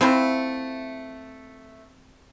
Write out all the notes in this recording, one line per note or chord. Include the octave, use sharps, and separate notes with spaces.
A3 C4 E4 F4